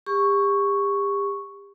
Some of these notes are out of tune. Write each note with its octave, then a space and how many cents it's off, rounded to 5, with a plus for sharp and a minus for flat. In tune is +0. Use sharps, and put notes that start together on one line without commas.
G4 +40 C#6 +0